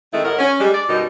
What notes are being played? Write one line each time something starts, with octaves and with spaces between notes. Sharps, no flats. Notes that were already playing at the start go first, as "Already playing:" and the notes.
D#3 G#3 A3 C4 E4
A2 G#3 A#4 F#5
C#4
G3 G#3
D5
F#2 B2 G3 D#4